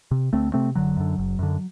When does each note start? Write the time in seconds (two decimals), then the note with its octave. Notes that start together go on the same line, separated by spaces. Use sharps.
0.11 C3
0.33 D2 A3 C4
0.54 C3 A3 C4
0.75 F#1 D3 F#3
0.97 F#2 D3
1.18 F#1
1.39 F#2 D3